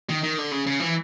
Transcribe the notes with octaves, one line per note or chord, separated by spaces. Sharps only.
D#3
D#3
D3
C#3
C#3
E3